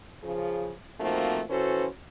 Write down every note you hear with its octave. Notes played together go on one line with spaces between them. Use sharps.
C#3 F3 G#4
F3 A3 A#3 C4 D#4 F#4
E3 C#4 F#4 A4 B4 C5